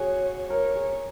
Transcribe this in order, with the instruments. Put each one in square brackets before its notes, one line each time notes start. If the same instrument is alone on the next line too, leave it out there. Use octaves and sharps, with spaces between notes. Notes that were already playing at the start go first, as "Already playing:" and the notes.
Already playing: [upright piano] F#4 G#4 [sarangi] C#5
[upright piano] A#4 [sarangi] C#5
[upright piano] G#4